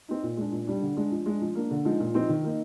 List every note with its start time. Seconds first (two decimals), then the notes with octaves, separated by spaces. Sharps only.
0.08 C4 D#4
0.23 A#2
0.37 G#3 D4
0.52 A#2
0.67 G3 D4
0.82 D3
0.97 G#3 D4
1.12 F3
1.26 G#3 D4
1.41 F3
1.55 A#3 D4
1.71 D3
1.85 F3 G#3 D#4
2.00 A#2
2.14 F3 C4 D#4
2.29 D#3
2.44 A#3 D#4